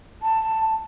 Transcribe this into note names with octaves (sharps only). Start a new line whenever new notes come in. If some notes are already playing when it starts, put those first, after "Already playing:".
A5